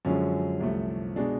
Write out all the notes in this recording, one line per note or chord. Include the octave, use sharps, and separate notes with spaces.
F#2 D3 F3 G#3 C#4
C2 C3 F3 A3
B2 G#3 D4